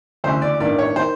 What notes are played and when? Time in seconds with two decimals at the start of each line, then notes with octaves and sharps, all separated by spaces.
0.24 D2 C#3 E3 C5
0.42 D5
0.60 A1 G2 D#3 D5
0.79 C#5
0.96 D#3 C5